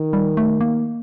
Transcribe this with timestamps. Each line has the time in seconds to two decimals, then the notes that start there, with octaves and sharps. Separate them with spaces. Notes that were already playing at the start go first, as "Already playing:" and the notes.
Already playing: D#3
0.13 G3
0.37 A3
0.61 A#3